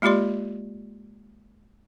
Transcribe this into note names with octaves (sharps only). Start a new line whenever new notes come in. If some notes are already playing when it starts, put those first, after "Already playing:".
G#3 A#3 F4 G4 D5 C6